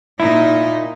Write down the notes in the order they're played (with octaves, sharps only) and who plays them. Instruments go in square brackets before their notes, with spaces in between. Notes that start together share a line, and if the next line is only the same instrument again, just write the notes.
[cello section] A#2 D#4 [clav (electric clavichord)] E4